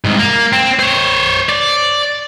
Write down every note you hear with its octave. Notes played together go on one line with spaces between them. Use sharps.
C2 G#2
A#3
C4
C5 C#5
D5